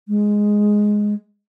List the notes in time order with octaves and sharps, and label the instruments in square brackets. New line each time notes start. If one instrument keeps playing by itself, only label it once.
[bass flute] G#3